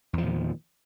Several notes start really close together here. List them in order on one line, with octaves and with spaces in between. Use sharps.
E2 F3 A#2 D#3